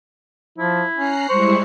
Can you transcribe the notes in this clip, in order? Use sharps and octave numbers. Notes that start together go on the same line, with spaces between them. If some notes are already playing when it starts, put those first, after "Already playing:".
F3 E4
C#4 A#5 F#6 C7
G3 G#3 E4 C5 C#6